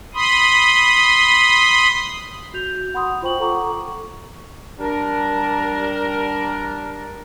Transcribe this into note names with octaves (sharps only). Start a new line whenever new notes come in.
B5 C6 D#6
F#4 G6 F7
F#5 B5 C6 D#6
F4 C5 G5 C#6 F#7
A4 F#5 A#5 C#6 D6
G3 D4 A#4